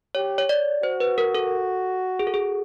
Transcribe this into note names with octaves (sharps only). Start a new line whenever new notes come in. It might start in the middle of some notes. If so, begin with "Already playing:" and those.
G4 C#5
C#5
D5
F#4 C5
B4
A#4
A4
G#4
A4
G#4